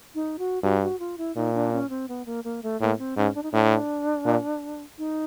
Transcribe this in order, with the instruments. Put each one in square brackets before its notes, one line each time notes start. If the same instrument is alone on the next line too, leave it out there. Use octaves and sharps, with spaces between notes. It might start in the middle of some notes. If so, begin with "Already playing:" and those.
[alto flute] D#4
F#4
[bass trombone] G2 [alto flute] F#4
[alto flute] F#4
F4
E4
[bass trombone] A#2 [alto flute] D#4
[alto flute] D4
C#4
C4
B3
A#3
A#3
A3
[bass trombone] A2 [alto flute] A#3
[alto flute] C4
[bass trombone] G#2 [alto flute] C#4
[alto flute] D4
D#4
[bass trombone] A2 [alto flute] D4
[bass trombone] A#2
[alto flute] D#4